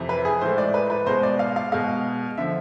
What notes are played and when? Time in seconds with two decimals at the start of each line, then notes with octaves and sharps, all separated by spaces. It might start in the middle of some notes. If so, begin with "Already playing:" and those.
Already playing: F2 C3 E3
0.09 B4
0.25 G#4
0.41 A2 E3 G#3 C5
0.58 D5
0.74 B4
0.90 B4
1.06 B2 G#3 C5
1.23 D5
1.39 F5
1.56 F5
1.72 B2 G#3 F5
2.38 D3 F3 E5